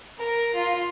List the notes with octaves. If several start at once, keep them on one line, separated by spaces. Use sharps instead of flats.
A#4
F4